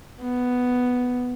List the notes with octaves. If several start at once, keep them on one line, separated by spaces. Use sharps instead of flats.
B3